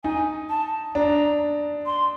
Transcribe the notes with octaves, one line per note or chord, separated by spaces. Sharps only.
D#4 G#5
A5
D4 A#5
C6